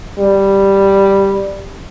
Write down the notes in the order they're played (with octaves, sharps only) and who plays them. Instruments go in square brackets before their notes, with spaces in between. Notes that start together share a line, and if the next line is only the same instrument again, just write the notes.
[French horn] G3